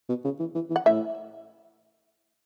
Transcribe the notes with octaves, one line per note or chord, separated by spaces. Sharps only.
B2
C#3
E3
E3
E3
F#5
A2 E5